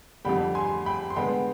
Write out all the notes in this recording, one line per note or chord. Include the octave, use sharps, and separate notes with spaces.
F2 D3 G3 G5 B5
G#5 C6
G5 B5
C6
D3 G#3 B3 G5 B5